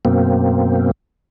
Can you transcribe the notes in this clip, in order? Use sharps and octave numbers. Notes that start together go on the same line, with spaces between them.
F#2 B2 A#3 C4